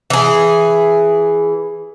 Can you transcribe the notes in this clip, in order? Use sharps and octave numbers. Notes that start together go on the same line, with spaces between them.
E3 G#4